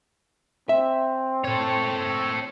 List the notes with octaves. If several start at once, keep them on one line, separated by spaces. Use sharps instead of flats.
C4 E5
A4 C#5